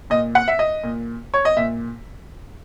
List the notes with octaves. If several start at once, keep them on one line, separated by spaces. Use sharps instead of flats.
A#2 D#5
F#5
E5
D#5
A#2
C#5
D#5
A#2 E5